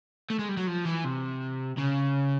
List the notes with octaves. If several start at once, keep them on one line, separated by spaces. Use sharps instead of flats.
A3
G#3
G3
F#3
F3
E3
C3
C#3